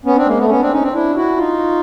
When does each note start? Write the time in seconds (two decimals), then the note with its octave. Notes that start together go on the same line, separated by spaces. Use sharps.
0.05 B3 C#4
0.16 C4 D4
0.26 G#3 A#3
0.38 A3 B3
0.49 B3 C#4
0.60 C4 D4
0.71 C#4 D#4
0.82 C4 D4
0.93 D4 E4
1.15 E4 F#4
1.38 D#4 F4